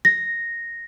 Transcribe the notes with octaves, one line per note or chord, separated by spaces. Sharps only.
A#6